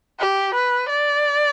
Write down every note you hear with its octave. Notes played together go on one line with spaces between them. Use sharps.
G4
B4
D5